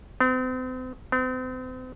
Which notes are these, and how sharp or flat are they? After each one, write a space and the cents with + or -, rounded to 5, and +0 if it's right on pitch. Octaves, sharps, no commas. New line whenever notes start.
C4 -40
C4 -40